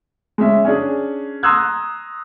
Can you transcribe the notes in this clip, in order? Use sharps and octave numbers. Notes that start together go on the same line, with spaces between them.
G#3 C#4 E5
C#4 D4 G#4
A#5 C6 D#6 E6 F#6 G#6